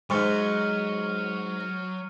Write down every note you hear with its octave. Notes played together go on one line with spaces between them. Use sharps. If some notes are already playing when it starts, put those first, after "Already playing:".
G#2 F#3 C#6 F6 C#7